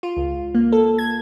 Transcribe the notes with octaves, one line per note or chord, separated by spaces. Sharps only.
F4
C#2
A#3
A4
G#6